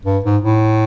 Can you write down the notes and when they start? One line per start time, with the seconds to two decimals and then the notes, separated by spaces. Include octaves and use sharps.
0.06 G2
0.25 G#2
0.42 A2